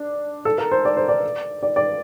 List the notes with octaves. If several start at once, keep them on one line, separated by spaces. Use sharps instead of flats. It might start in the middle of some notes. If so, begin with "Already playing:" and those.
Already playing: D4
A4
A#4
C5
D5
C5
D5
D5
D5